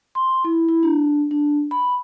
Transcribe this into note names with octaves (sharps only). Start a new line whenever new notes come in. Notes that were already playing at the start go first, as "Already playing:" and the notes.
C6
E4
E4
D4
D4
B5